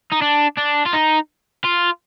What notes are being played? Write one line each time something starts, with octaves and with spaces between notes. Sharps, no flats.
D#4
D4
D4
F4
D#4
F4